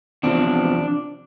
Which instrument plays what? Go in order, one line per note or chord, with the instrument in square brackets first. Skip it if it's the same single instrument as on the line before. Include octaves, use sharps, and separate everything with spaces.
[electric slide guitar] E2 C3 F3 D4